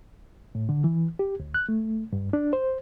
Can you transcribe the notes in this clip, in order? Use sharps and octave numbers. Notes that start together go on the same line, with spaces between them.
A2
D3
E3
G4
D2
F#6
A3
G2
D4
C5